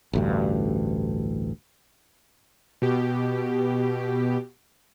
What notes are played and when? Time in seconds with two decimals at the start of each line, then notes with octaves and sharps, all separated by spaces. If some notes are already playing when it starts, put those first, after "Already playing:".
0.13 A1 D2 G2
2.82 B2 G4